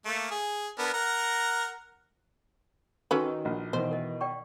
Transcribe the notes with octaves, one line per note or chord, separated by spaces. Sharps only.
A3 A#3
G#4
B3 D4 A#4
A#4 F#5 A#5
D#3 C#4 F#4 A4 B4 D6
A#1
B2 D#3 E3 C5
A#4 D#5
D5 G5 C#6